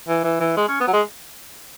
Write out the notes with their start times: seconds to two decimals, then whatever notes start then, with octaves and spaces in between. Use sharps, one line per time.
0.08 E3
0.24 E3
0.41 E3
0.57 G#3
0.69 C#4
0.81 B3
0.88 F#3
0.93 G#3